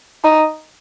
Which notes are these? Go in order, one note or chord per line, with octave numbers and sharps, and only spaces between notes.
D#4